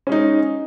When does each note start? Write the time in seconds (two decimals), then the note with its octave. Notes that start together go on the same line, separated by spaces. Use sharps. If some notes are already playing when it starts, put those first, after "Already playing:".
0.07 C#4
0.09 G#3
0.12 D#4